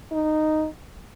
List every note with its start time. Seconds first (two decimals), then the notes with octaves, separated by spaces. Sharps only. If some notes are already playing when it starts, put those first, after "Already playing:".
0.11 D#4